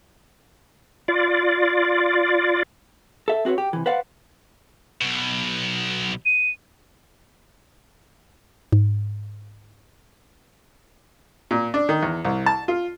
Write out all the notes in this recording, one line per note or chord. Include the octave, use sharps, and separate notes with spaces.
F4 D5
A4 E5
C4 F#4 G#4 B4 C#5
G4
C3 E3
B4 C5 D5 F5 F#5
B1 B2
D#7
G#2
A#2
D4
D#3
E2
C2
A5
F4